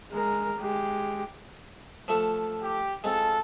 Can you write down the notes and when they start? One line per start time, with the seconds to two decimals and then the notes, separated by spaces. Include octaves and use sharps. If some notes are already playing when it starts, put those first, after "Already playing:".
0.11 G#3 A#4
0.59 G#3 G4
2.08 F3 A3 A4
2.62 G4
3.04 G#3 C4 F4 A4